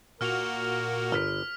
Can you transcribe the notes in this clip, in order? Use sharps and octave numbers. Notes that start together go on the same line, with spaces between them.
A#2 A#3 F#4 A#4 F6 F7
G1 F6 B6